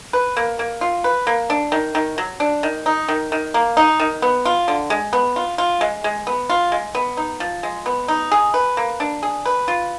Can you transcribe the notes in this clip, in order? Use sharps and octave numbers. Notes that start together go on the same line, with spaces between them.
B4
A#3
A#3
F4
B4
A#3
D4
D#3
D#3
F#3
D4
D#3
D#4
D#3
D#3
A#3
D#4
D#3
B3
F4
D3
G#3
B3
F4
F4
G#3
G#3
B3
F4
G#3
B3
D#4
F3
G#3
B3
D#4
G#4
B4
A#3
D4
G#4
B4
F4